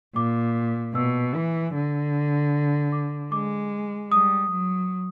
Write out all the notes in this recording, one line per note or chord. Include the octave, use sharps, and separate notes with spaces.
A#2 D6
B2 E6
E3
D3
D6
G#3 D6
G3 D#6
F#3